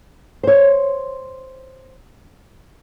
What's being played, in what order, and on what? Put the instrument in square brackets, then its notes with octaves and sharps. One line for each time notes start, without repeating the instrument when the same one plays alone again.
[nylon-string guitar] C5 C#5